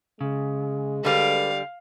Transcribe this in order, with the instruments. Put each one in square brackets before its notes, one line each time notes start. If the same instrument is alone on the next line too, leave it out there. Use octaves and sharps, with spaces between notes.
[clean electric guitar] C#3 [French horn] G#3
[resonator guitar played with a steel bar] D3 G3 [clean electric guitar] A4 B4 [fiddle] F5